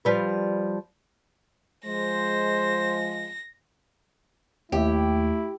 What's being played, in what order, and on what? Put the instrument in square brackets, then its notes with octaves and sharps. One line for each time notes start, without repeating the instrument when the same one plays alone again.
[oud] F3 G3 B4
[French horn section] F3 G#3 [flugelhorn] C5 [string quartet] A#6
[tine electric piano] D#2 [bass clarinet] A3 [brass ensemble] E4 [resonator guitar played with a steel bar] G4